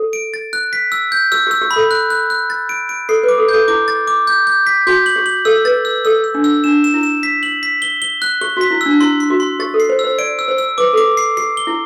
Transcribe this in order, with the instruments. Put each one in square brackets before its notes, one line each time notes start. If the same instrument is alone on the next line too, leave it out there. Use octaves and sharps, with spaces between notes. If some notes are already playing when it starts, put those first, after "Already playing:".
Already playing: [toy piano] A4
[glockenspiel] D7
A6
F#6
B6
E6
G6
[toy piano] G4 [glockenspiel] E6
[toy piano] G4 [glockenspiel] E6
[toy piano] G4
[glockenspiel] B5
[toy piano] A4
[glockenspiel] F#6
F#6
F#6
A6
D7
D7
[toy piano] A4 [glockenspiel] C7
[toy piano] B4
[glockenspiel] D6
[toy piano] A4
[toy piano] A4 [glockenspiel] G6
[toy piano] E4 [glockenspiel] D6
[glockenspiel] A6
D6
G6
G6
B6
[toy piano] F#4 [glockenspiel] G6
[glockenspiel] F#7
[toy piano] G4
[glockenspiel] F#7
[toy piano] A4 [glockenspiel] E6
[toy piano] B4 [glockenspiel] A6
[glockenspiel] E6
[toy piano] A4 [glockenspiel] E6
[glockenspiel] E6
[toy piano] D4
[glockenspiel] E6
[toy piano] D4 [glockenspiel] E7
[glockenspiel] E7
[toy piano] E4
[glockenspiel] E7
B6
F#7
B6
G7
G7
F#6
[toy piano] G4 [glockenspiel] G7
[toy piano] F#4 [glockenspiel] B6
[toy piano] E4
[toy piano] D4 [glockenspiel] E6
[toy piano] E4 [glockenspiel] C6
[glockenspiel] C6
[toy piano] F#4
[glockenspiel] C6
[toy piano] G4 [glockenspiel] A6
[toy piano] A4
[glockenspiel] C7
[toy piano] C5
[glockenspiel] E6
[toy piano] C5
[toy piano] D5 [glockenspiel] D7
[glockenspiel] E6
[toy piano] C5
[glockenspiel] E6
[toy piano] B4 [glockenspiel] D6
[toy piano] A4 [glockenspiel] D6
[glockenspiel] C7
[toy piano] G4 [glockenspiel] C7
[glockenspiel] G7
[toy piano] E4